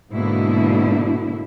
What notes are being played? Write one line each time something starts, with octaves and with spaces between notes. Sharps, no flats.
G#2 B2 D3 A#3 E4